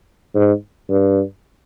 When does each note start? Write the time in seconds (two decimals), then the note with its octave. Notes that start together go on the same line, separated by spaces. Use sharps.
0.35 G#2
0.89 G2